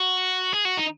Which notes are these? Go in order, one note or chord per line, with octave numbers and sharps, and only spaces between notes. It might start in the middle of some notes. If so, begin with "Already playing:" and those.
Already playing: F#4
G#4
F#4
D#4